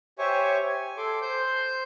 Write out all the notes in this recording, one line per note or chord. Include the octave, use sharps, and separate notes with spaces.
G4 C5 C#5 E5 G#5 C#6
G#5
A4 C6 D6
C5 C6 G6